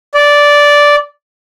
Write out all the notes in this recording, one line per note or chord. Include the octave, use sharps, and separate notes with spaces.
D5